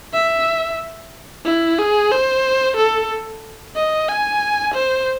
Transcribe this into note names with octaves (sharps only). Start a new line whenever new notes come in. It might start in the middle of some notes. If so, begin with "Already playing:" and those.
E5
E4
G#4
C5
A4
D#5
G#5
C5